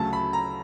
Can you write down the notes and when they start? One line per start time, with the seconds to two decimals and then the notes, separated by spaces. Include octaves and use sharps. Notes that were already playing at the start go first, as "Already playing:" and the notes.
Already playing: D2 C#3 F#3 A3 A5
0.13 B5
0.33 A#5